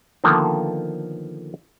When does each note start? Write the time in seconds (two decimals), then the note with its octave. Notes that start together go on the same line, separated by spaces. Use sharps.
0.24 D3 D#3 F3 A#3 B3 A4